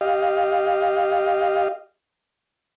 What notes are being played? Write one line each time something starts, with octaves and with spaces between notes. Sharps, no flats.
G4 D#5 F5